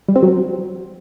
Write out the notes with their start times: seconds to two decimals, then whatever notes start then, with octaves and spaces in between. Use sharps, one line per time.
0.08 G3
0.16 C4
0.23 F#3